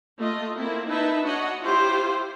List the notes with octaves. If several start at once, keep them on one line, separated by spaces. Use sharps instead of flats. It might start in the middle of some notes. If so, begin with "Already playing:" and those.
A3 F4 D#5
A#3 C4 E4
D#4 E4 B4 E5 A5
D4 F#4 C#5 D#5 F#5
E4 F4 G4 C5